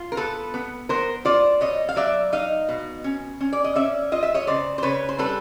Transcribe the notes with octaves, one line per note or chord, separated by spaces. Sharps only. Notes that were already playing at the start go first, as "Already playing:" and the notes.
Already playing: F4
A#4
B3 A4 B4
B3
B3 A#4 C5
F4 C5 D5
B2 C#5 D#5
F5
F#3 D5 E5
D#4 D#5 F5
B2
C#4
C#4
D5
D#5
C#4 D5 E5
F4 D#5
E5
C#5 D#5
C#3 C5 D5
C5
C#3 B4 C#5
C5
G3 A4 B4